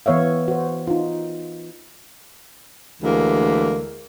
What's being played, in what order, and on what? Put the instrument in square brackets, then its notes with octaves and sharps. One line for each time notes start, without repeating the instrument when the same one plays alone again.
[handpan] E3 B3 C#5 E5 F5
F#4 C5
D#4 F4
[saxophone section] D2 E3 G#3 A#3